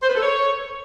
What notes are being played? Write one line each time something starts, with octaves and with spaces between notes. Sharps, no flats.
C5
B4
A4
C#5